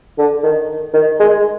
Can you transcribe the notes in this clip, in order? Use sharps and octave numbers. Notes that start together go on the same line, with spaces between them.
D3
D#3
D#3
G#3